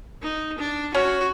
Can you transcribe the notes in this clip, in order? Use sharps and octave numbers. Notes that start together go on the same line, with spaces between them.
D#4
D4
C#4 F#4 C#5